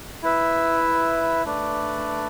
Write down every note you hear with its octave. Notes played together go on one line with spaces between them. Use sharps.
E4 B4 E5
A3 D4 B4 D5